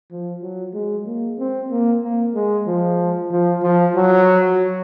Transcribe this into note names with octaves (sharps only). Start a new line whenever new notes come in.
F3
F#3
G#3
A#3
C4
A#3
A#3
G#3
F3
F3
F3
F#3